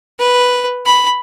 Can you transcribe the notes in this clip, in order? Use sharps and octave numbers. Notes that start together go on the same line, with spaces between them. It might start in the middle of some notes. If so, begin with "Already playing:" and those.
B4
B5